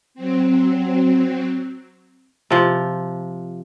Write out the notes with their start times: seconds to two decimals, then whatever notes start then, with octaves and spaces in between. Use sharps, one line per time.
0.14 F#3 C4
2.50 C3 F3